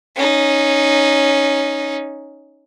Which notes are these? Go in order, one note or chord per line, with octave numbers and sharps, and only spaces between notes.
C#4 D#4